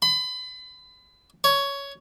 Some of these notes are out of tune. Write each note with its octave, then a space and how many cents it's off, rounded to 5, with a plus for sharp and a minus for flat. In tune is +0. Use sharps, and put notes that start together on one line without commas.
B5 +35
C#5 +10